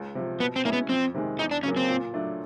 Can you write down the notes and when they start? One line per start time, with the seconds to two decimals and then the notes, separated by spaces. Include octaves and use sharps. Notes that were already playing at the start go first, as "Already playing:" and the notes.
Already playing: C#2
0.15 C3 F3
0.40 B2 B3
0.56 C4
0.65 G#3 A#3 C#4 E4
0.73 B3
0.89 F2 C4
1.14 C3 D#3 G#3
1.39 E2 D#4
1.51 D4
1.63 C#3 F#3 A#3 C#4
1.77 C4
1.88 A#2
2.13 F#3 A3 D4